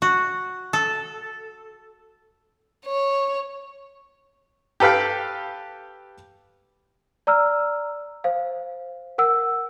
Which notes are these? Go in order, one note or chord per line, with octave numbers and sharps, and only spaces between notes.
F#4
A4
C#5
G4 A4 B4 F5 G5
D5 A#5 E6 F6
C5 F5
A#4 F#5 E6